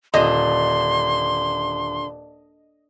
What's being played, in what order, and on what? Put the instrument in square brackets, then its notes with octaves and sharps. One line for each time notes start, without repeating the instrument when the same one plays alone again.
[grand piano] D#1 [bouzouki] D3 [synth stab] D#5 [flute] C6